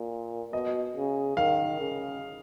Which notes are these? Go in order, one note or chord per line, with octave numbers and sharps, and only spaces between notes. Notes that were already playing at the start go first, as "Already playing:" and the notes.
Already playing: A#2
B2 D#5
C#3
D#3 F5
C#3